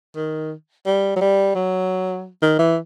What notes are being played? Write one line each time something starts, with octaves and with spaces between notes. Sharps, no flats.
D#3
G3
F#3
G3
F#3
D#3
E3